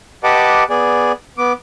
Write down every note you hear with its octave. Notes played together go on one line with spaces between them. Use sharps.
G4 B4 D#5 F#5 A5 D6
B3 G#4 D5
B3 D6